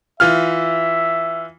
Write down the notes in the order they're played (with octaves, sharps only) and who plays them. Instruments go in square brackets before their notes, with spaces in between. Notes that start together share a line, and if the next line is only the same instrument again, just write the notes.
[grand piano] E3 F4 F6 [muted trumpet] E5